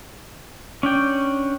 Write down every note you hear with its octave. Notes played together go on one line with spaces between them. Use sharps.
C#4 D4 G5